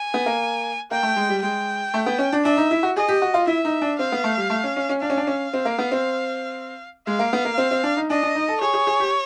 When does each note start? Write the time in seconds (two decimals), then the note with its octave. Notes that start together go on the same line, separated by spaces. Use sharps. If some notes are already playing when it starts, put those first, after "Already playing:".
Already playing: G#5
0.14 B3
0.26 A#3
0.91 A#3 G5
1.03 A3
1.16 G#3
1.29 G3
1.42 G#3 G5
1.94 A3
2.06 B3
2.18 C#4
2.32 D4
2.44 D4 E5
2.57 D#4
2.71 E4
2.83 F#4
2.97 G#4 D#5
3.08 G4
3.22 F#4
3.34 F4
3.47 E4 E5
3.65 D#4
3.82 D4
3.99 C4 F5
4.12 B3
4.24 A3
4.37 G3
4.50 A3
4.64 C#4
4.76 C#4
4.89 C#4
5.02 D4 F5
5.10 C#4
5.17 D4
5.27 C#4
5.53 C4
5.65 A#3
5.78 B3
5.92 C4
7.07 G#3 F5
7.19 A#3
7.33 B3
7.45 A#3
7.58 C4
7.71 C4
7.83 D4
7.97 D#4
8.10 D4 D#5
8.23 D4
8.35 D#4
8.48 A4
8.61 G#4 C#5
8.74 G#4
8.87 G#4
9.00 G4